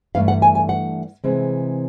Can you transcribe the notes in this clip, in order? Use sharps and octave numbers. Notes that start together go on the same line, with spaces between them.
G2 E3 A3 D4 F5
F#5
G#5
G#5
F#5
C3 E3 G#3 C4